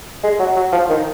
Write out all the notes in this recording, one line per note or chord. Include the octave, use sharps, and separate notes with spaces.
G#3
F#3
F#3
F3
D#3